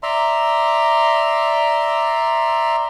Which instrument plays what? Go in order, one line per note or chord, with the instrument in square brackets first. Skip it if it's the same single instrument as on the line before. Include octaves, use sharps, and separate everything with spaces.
[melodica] D5 E5 A#5 C6